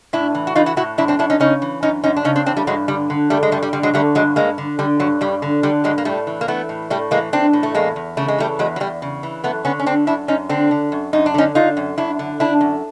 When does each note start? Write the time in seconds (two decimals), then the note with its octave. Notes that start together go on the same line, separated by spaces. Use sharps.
0.13 A2 D4 E4
0.35 E3
0.47 F#4
0.55 E3 D#4 F4
0.66 E4 F#4
0.77 A2 E4 F#4
0.98 F#2 D4 E4
1.08 C4 D4
1.19 F#2 D4 E4
1.30 C#4 D#4
1.40 C#3 C#4 D#4
1.62 E3
1.83 F#2 C#4 D#4
2.04 F#2 C#4 D#4
2.16 D4
2.24 C#3 C#4 D#4
2.36 C4 D4
2.46 E3 C4 D4
2.57 G3 A3
2.67 G2 F#3 G#3
2.88 D3 G3
3.10 D3
3.30 G2 G3 A3
3.43 G#3
3.52 G2 G3 A3
3.63 G3
3.73 D3 G3
3.83 F#3 G#3
3.94 D3 G3 A3
4.15 G2 F#3 G#3
4.36 G2 G#3 A#3
4.58 D3
4.79 D3 G3
4.99 G2 F#3
5.21 G2 G3
5.42 D3
5.63 D3 G3
5.84 G2 F#3 G#3
5.98 A#3
6.05 A2 G3 A3
6.27 E3
6.41 A#3
6.48 E3 A3 B3
6.69 A2
6.90 A2 G3 A3
7.11 E3 G#3 A#3
7.33 E3 C4 D4
7.53 A2
7.63 A3
7.74 E2 G#3 A#3
7.96 E2
8.17 C#3 A3
8.28 G#3
8.38 E3 G3 A3
8.59 E2 F#3 G#3
8.76 F#3
8.80 E2 G3
9.02 C#3
9.23 E3
9.44 F#2 A3 B3
9.65 D3 B3 C#4
9.80 C#4
9.86 D3 C4 D4
10.07 F#2 D4 E4
10.28 F#2 C#4 D#4
10.49 D3 C4 D4
10.71 D3
10.92 F#2
11.13 F#2 D#4
11.26 D4
11.34 D3 C#4 D#4
11.55 D3 D#4 F4
11.77 F#2
11.98 F#2 D4 E4
12.19 D3
12.40 D3 D4 E4
12.61 F#2